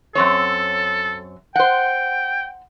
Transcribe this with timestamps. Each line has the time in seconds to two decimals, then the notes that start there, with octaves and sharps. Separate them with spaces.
0.15 F#2 C4 A4 C#5
1.56 C5 F#5 G5